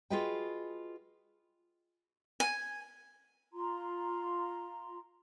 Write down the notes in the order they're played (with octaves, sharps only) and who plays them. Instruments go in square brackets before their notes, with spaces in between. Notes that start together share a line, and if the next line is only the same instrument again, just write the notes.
[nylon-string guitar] F4 F#4 G#4 B4 D#5 G5
[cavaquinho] G#5
[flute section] F4 A#5 C6